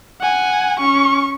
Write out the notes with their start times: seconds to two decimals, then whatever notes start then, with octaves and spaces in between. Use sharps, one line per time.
0.21 F#5 G#5
0.79 C#4 C#6